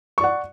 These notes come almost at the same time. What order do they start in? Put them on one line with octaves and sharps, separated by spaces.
C#6 D5 F#5